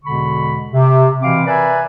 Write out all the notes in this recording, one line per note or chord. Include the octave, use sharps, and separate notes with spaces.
E2 B2 D3 G#3 B5 C#6
C3
B2 E3 C4 F5 B5 D6
A#4 B4 D5 E5 G#5